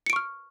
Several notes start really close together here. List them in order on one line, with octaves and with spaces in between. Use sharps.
C#7 D7 C#6 F6